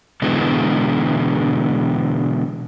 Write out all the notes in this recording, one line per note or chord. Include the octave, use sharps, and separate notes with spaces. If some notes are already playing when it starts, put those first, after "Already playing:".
B2 D3 E3 G#3